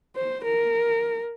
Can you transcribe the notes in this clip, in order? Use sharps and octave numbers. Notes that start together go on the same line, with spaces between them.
C5
A#4